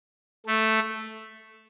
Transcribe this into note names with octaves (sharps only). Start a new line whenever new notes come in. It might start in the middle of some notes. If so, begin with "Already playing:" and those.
A3